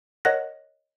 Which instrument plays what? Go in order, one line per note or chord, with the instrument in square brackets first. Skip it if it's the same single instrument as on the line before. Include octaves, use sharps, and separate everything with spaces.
[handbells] A#4 C#5 D#5 F#5 F#6 A#6